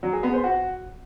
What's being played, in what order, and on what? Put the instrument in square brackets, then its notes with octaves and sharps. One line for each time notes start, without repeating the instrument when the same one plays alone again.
[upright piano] F#3
G#4
B3
C5
F#4